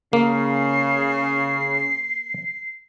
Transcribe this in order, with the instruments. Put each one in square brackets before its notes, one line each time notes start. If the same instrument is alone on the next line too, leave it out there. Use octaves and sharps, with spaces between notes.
[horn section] C#3 [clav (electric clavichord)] A#3 [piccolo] C7